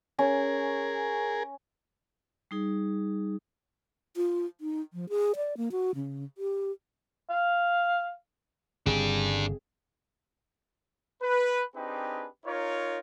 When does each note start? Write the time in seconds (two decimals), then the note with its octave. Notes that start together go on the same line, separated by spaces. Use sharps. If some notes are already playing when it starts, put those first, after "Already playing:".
0.19 C#4 G#4 A#4
2.51 G3 D#4 G#4
4.16 F4
4.61 D#4
4.93 F3
5.09 G#4
5.36 D5
5.57 A#3
5.72 F#4
5.95 C#3
6.38 G4
7.30 F5
8.86 G1 C#3 C4 D4 G4 G#4
11.22 B4
11.76 C4 D4 D#4 G4 G#4 B4
12.46 D#4 F4 A#4 C#5